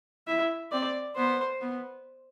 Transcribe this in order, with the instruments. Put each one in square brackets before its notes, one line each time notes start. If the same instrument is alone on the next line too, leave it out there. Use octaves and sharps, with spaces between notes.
[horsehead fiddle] E4 [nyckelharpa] E5
[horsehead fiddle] C4 [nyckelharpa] D5
[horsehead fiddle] B3 [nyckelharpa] C5
[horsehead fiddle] B3